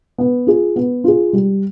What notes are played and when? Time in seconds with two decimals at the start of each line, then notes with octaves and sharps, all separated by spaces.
0.18 B3
0.47 F4 G#4
0.76 B3
1.04 F4 G#4
1.33 G3